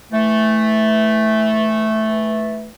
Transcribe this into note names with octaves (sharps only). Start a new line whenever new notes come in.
E3 A3